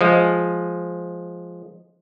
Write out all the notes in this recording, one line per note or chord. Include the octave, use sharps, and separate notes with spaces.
F3 G#3